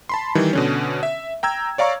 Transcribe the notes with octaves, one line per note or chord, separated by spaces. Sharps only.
A5 B5 C6
D#3 E3 G3
B2 D3 C#4
E5
G5 A#5 E6 G#6
C#5 D5 F5 A#5 C#6